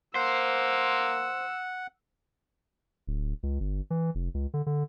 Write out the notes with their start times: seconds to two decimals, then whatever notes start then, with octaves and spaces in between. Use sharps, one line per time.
0.15 A#3 C5 F#5 E6
3.07 D1
3.43 C#2
3.60 G1
3.90 E3
4.15 F1
4.34 C#2
4.54 D3
4.66 D3